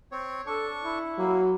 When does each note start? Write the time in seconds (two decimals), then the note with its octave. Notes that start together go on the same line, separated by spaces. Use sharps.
0.12 C4 C#5
0.47 D4 A4 C#6
0.84 E4
1.18 F#3 A#3